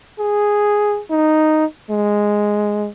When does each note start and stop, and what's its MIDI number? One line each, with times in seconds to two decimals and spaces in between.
0.19 1.00 68
1.11 1.65 63
1.90 2.88 56